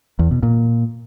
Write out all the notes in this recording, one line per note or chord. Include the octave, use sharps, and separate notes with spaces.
E2
B2
A#2